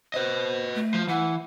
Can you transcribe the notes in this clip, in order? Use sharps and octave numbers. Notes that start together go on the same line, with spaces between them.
B4 C5 D#5
A3
F3
E3 F#5